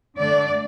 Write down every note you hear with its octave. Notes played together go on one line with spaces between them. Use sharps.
D3 A3 D4 D5